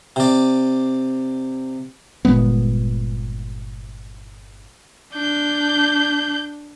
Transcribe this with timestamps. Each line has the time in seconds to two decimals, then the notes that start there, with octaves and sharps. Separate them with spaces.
0.16 C3 D5
2.25 G1 A#2 G#3 B3
5.13 D4 G6